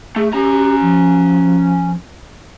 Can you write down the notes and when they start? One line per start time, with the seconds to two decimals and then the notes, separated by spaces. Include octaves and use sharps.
0.16 A3 G#4
0.33 C#4 G4 A#5
0.81 F3